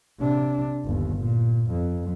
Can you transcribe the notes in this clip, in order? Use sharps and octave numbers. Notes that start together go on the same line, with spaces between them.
C3 D4
G1 D#2
A#2
F2